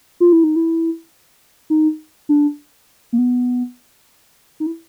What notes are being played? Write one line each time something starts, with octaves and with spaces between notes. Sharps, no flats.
F4
E4
D#4
E4
D#4
D4
A#3
B3
D#4
E4